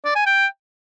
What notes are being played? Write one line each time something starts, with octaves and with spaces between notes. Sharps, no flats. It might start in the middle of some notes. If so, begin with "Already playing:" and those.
D5
G#5
G5